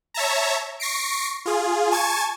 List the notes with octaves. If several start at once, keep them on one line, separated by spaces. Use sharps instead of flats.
C#5 E5 A5 A#5
C#6 A#6 C7 D7
F4 G#4
G#5 A5 C#6 G#6 A6